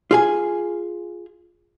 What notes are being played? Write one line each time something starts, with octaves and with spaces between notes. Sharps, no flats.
F4 G#4 G#5